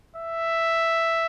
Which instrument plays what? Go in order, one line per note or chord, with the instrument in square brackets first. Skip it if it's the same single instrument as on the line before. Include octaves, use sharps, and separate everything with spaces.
[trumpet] E5